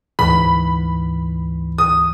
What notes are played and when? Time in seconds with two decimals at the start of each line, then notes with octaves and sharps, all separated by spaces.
0.19 D2 G#2 E3 B5
1.78 D#6